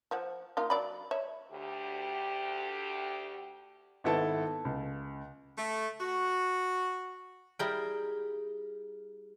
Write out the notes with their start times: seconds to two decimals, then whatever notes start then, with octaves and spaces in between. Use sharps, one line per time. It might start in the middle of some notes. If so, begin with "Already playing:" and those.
0.11 F3 C5 F#5
0.57 A#3 D#4 F4
0.70 F#3 D5 B5
1.11 C#5 E5
1.51 D2 G4
4.04 G#1 B3 E4 A4 B4 A5
4.65 C#2
5.58 A3
6.01 F#4
7.59 G3 E4 G#4 A#4 G5